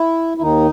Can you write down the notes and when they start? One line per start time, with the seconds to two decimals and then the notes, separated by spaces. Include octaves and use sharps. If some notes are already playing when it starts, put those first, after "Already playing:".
Already playing: E4
0.37 E4
0.41 D#2 D#3 D#4